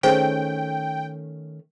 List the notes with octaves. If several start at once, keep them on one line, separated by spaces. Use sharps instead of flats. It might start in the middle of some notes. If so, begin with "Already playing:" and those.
D#3 A3 C#4 G#4 C5 G5